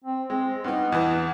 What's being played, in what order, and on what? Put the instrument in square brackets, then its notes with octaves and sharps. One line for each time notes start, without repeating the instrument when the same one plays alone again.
[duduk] C4
[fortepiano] G#3 [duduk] C4
[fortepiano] G2 D#4 [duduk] B3
[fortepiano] E2 E3